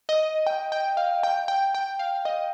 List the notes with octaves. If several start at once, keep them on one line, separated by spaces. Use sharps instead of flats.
D#5
G5
G5
F5
G5
G5
G5
F5
D#5